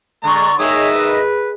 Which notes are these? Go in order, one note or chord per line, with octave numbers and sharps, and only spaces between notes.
D3 G#3 D5 A#5 C6 C#6
D#3 G#3 G#4 C#5 D#5 E5 D#6 E6
B4